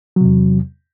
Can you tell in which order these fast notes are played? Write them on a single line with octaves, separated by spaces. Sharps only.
F#3 C3 E2